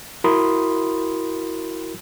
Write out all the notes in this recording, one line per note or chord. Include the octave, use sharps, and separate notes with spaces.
E4 F#4 A#4 B5 C6 D#6